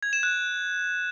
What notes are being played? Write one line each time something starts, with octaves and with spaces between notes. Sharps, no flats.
G#6
E7
F#6